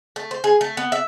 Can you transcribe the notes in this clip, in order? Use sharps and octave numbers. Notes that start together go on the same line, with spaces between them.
A3
C5
G#4
A3
B3
E5